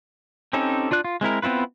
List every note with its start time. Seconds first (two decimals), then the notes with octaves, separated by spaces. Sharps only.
0.53 C4 C#4 D#4 G4 A4
0.91 D4 F4 D5 F#6
1.04 F4
1.21 G#3 C4 E4 A#4
1.42 B3 C4 E4 F4 B4